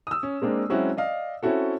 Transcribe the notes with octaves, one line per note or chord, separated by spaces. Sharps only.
D#6 E6
C#4
G#3 A#3 C4 D4
F#3 G#3 C4 C#4 E4 F#4
D5 D#5 F5
C4 C#4 E4 F#4 A4